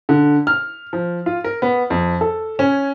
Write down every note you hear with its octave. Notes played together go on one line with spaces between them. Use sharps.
D3
F6
F3
F4
A#4
B3
F2
A4
C#4